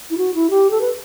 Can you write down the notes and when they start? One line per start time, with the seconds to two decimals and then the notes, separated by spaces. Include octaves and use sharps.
0.10 E4
0.18 F#4
0.35 E4
0.50 G4
0.71 A4
0.81 B4